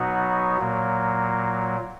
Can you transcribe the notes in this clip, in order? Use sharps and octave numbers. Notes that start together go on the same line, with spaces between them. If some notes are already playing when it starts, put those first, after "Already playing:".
Already playing: B2 F#3 B3 D#4 F#4
A#2 F#3 A#3